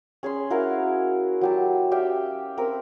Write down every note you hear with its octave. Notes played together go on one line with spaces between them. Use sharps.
C#4 G#4 B5 C6
E4 F#4 A#4 F5
F#3 G4 A5
G4 E5 F5 G5
C4 A#4 B5